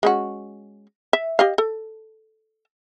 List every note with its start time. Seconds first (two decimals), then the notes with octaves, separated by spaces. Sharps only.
0.03 G#3 C#4 F#4
1.13 E5
1.39 G4 D#5 F5
1.58 A4